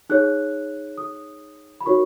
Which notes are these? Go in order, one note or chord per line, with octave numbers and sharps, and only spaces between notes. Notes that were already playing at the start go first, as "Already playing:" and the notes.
D#4 G#4 C#5 F#6
D#6
B5
D#4 F#4 A#4 C#5 C#6